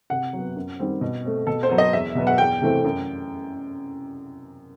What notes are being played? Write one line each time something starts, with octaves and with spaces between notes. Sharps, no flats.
C3 F#5
F#3
B3
F#2
D#3 G3 C4
B2
A3 C4
B2 A4
C5
F#3 B3
D#5
E2 E5
B2 F#3 B3
F#5
E2 G5
C3 E3 A3 C4
F#2